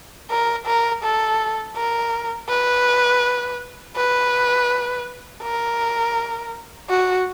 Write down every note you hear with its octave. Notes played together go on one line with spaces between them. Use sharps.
A#4
A#4
A4
A#4
B4
B4
A#4
F#4